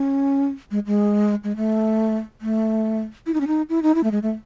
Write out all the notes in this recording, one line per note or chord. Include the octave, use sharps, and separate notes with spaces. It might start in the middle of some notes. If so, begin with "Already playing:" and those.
Already playing: C#4
G#3
G#3
G#3
A3
A3
E4
D#4
C#4
D#4
E4
D#4
E4
A3
G#3
A3